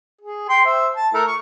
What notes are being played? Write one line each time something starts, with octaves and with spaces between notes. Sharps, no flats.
G#4
G5 C6
C5 E5
A5
A3 E4 A#4
C#6